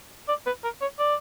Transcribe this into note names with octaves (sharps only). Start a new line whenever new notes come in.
D5
B4
A#4
C#5
D5